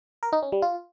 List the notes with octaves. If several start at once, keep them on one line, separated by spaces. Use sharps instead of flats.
A#4
D#4
C#4
G3
F4